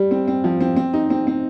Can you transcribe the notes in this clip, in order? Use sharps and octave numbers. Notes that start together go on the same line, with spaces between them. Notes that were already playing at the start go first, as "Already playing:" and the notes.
Already playing: G3
C4
C4
F3
C4
C4
D#4
C4
C4